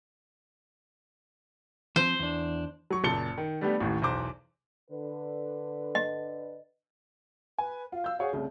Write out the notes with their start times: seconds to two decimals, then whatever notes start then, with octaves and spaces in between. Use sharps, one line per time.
1.96 F3 C4 C5
2.19 E2 D4
2.90 F#3 C#6
3.04 F#1 A#2 A5 C#7 G7
3.38 D#3
3.61 G3 A3 B3 D4 G4
3.81 A1 D#2 A2
4.02 B1 E2 C5 D6
4.91 D3 B4
5.95 D#5
7.58 B4 G#5
7.92 F4 F5
8.04 E6 G6
8.19 G#4 C#5 F5 F#5
8.33 C2 C#3 A3